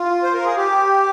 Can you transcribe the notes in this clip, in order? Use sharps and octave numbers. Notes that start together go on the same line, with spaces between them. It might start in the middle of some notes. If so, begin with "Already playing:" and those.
Already playing: F4
C5
A#4
G#4
G4